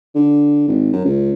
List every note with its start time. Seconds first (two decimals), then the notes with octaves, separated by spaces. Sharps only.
0.15 D3
0.68 G#1
0.93 F#2
1.05 C#2